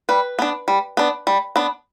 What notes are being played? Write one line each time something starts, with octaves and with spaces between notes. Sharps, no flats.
G3 B4
B3 D4
G3
B3 D4
G3
B3 D4